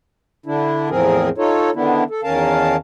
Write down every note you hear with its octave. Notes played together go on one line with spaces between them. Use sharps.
D3 D4 E4
E2 A2 F3 C4 G#4 A#4
D#4 F4 A4 C#5
D3 D#3 B3 D4 E4
A4
E2 D#3 C#4 A#4 F5 A5